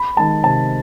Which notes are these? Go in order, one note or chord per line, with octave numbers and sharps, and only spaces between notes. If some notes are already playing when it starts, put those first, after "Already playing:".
Already playing: B5
D#3 G#3 A5
C3 A5